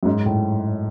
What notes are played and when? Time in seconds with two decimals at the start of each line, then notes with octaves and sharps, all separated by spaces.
0.03 F#2
0.06 G#2
0.26 A2